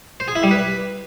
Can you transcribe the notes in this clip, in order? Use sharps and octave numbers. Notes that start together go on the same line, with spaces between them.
C5
G#4
E4
G3
B4